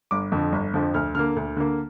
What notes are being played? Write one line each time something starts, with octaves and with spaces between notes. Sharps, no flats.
G1 D6
F2 D3 F3
G1
F2 D3 F3
D2 F6
D3 A#3 F6
D2
D3 A#3